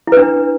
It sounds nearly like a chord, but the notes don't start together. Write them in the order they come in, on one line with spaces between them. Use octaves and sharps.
E4 B4 D4